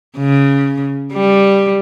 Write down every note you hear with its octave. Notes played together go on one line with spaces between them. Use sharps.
C#3
G3